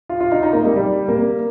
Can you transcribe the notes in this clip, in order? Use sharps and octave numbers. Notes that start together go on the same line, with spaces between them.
F4
F4
D#4
D#4
A#3
G3
G3
A#3